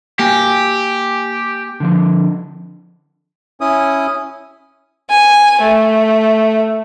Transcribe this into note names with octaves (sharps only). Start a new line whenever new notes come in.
A#3 G4 G#5
D3 F3 D4
C#4 E4 D#6
G#5
A3